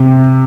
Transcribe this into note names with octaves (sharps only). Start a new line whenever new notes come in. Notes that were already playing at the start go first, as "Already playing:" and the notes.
Already playing: C3